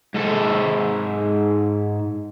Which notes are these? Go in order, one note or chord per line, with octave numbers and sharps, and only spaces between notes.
G#2 A4